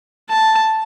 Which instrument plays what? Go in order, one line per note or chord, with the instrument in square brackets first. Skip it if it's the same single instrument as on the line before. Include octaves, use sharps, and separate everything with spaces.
[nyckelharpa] A5